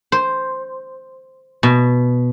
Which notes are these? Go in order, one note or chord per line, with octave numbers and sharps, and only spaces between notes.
C5
B2